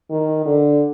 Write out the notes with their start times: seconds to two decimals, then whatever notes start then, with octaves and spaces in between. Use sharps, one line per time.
0.10 D#3
0.46 D3